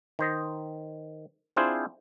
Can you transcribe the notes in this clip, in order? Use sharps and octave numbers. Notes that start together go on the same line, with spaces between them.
D#3 C5 D#5
C4 D4 E4 F4 G#4 C5